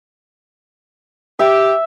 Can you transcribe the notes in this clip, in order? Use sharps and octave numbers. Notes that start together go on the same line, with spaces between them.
G4 E5